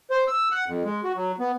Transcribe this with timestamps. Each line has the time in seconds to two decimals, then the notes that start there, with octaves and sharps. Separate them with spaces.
0.10 C5
0.28 E6
0.51 F#5
0.67 F2
0.85 G#3
1.04 F#4
1.16 F#3
1.39 B3